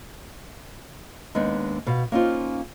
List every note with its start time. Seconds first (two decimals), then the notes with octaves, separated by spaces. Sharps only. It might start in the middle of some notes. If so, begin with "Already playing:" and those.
1.35 D#2 G#3 B3 D4 D#4
1.87 B2 F5
2.12 A#3 C#4 D#4 F4 C5